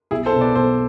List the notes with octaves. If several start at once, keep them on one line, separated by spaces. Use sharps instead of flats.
B1 E4 G#4
A4 C5
B2 B3
B4 D5
B1 A4 C5